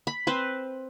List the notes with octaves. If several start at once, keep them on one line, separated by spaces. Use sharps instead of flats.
B5
C4 B4 C5